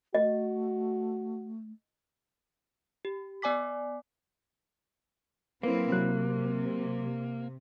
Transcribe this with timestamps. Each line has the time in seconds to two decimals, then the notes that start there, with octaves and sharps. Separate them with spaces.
0.14 A3 F#4 D#5
3.05 G4
3.42 B3 D5 G#5 D6 B6
5.63 F#3 A#3 C4 E4 B4
5.92 C3 F#3 F#6